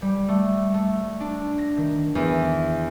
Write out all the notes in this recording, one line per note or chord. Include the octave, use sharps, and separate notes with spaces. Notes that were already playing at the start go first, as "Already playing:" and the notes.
G3
A3
A3
D4
A#6
D#3
E2